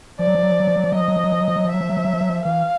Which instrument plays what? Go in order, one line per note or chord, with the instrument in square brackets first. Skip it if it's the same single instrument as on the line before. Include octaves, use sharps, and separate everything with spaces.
[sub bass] F3 [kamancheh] D5
[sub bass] F#3
F3
F#3
F3
F#3
F3
F#3
F3
[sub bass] F#3 [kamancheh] D#5
[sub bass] F3
F#3
F3
F#3
F3
F#3
F3
F#3
F3
[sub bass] F#3 [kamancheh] E5
[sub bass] F3
F#3
F3
F#3
F3
F#3
F3
[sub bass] E3 [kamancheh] F5